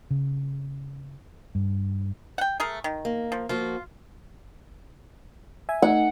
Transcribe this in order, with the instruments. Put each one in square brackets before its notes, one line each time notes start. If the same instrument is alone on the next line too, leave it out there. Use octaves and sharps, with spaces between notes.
[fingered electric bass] C#3
G2
[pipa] F#5 G5
A3 G#4 A#4
D#3
[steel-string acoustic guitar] A#3
[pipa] F3
[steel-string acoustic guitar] F3 A#3 F#4 [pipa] F4
[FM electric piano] E5 G#5
[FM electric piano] A3 D#4 [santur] F#5